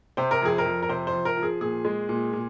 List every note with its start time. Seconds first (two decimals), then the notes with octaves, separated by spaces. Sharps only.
0.17 C3 C5
0.31 A#4
0.42 F2 G#4
0.58 A#4
0.66 F2
0.83 A#4
0.89 C3 C5
1.07 C5
1.13 F3
1.25 A#4
1.37 F3
1.43 G#4
1.61 A#2 G#4
1.85 G#3
2.09 A#2
2.33 A#2